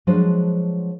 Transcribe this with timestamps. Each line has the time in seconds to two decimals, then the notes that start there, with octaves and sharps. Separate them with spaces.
0.07 F3 F#3 G#3 D4 B4 C5